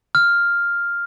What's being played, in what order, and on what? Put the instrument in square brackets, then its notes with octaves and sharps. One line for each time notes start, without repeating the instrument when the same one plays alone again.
[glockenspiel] F6